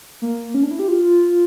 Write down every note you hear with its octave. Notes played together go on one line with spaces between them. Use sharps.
A#3
C#4
D4
E4
G4
F4